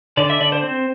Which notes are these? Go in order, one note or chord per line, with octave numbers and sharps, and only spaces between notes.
D3 D5
E5
D3 D5
C5
C4